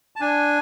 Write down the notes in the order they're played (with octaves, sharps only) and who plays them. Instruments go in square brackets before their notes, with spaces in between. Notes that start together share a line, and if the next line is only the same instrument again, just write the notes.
[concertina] A5
D4 G#5